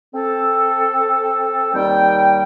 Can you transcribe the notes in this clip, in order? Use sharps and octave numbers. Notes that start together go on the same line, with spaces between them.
C4 A4
D#2 G3 G5